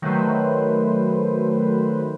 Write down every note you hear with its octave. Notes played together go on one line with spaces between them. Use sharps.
D#3 F#3 A3 B4 C5